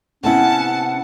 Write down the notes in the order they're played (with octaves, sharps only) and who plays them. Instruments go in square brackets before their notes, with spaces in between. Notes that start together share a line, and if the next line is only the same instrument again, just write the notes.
[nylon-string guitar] C3 B3 E4 [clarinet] C#4 [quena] F#5 [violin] A5